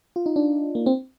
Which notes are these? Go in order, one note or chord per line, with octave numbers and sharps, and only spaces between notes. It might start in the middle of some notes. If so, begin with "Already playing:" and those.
F4
D#4
D4
A#3
C4